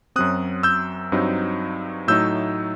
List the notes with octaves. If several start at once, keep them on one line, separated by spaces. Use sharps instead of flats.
F#2 F#3 C4 D#6 F#6
E6 G6
G2 F#3 C4 D#4
A2 F#3 A3 D#4 E6 G6